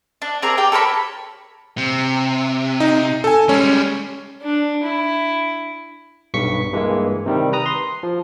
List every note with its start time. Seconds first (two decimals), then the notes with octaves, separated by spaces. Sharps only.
0.22 D4
0.42 C4 G#4 A#4 D5
0.57 G4 D5 G5
0.72 A4 A#4 C#5 B5
1.78 C3
2.80 D#4
3.24 A4 G#5
3.49 G3 G#3 C#4
4.42 D4
4.83 E4
6.34 B1 G2 C#6 B6 C#7
6.73 G2 E3 G#3 A#3
7.26 C3 D#3 G3
7.53 B4 A#5 D#6
7.66 C6
8.03 F3